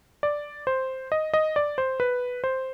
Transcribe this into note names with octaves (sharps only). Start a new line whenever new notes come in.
D5
C5
D#5
D#5
D5
C5
B4
C5